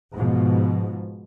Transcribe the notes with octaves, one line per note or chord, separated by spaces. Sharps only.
G#2 B2 F3